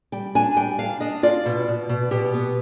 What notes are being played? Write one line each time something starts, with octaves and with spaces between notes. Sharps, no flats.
G3 G5
D4 G#5
G3 G5
D4 F5
D4 D#5
F4 D5
B2
B2
B2
B2 G4
B3